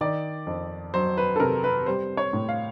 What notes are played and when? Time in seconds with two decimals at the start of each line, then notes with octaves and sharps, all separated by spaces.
0.01 D#3 D5
0.47 F2
0.94 F#3 C5
1.17 B4
1.36 A4
1.40 C3 A#4
1.64 B4
1.86 G3 C5
2.17 C#5
2.33 A2
2.49 F5